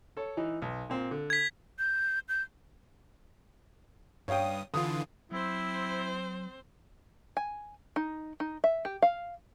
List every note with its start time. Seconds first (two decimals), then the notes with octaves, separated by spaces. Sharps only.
0.17 A4 C#5
0.37 E3 D#4
0.62 B1
0.90 A#2 C4
1.11 D3
1.30 G#6 B6
1.79 G6
2.29 G6
4.28 G2 C#5 F5 G5 D#6
4.74 D3 E3 F4 D#6
5.32 F#3 C4 E4 C5
7.37 G#5
7.96 D#4
8.40 D#4
8.64 E5
8.85 G4
9.02 F5